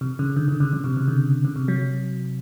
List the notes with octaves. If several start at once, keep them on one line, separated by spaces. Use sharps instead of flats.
C3
C#3
D3
D3
C#3
C#3
C3
C#3
D3
C#3
C3
F#3